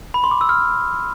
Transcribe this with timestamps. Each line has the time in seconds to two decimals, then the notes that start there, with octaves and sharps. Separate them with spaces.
0.14 B5
0.24 C6
0.31 D6
0.41 E6
0.49 F6